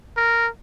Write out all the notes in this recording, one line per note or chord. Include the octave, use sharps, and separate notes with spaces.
A#4